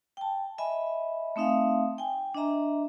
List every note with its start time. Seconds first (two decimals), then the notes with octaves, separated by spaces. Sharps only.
0.17 G5 A5
0.58 D#5 E5 G#5 B5
1.36 A3 C4 D#4 E5 F5
1.98 G5 G#5
2.34 D4 D#5 E5 A#5